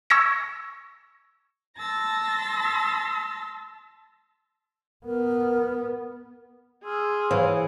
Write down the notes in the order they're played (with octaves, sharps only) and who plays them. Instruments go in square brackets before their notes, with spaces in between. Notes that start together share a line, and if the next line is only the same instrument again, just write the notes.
[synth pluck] C#6 E6 G#6 A#6 C#7
[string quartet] A5 C6 E6 A6 A#6
[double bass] B3 [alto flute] A#4
[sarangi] G#4 [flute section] C6 E6 F6
[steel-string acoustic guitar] E3 [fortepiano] C5 C#5 F5